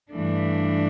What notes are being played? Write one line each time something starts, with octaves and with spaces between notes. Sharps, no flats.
G2 E3 A3 D4